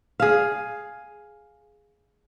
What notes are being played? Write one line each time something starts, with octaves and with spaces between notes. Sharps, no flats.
G#4 F5